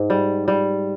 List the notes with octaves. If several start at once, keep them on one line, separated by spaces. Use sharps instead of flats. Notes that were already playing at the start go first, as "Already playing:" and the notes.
Already playing: G#2
G3
G3